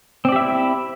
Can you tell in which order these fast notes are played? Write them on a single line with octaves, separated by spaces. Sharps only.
C4 D5 G4 E5 E4